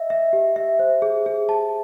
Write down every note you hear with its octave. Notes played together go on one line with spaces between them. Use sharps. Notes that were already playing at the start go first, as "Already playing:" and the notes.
Already playing: D#5 E5
E5
G4
E5
C5
G#4
G#4
A5